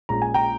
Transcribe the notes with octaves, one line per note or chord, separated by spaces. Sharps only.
A#1 A#2 G#3 C#4 A#5
G#5
G5 A#5